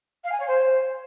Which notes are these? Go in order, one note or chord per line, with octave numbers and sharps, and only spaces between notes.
F5
G#5
C#5
C5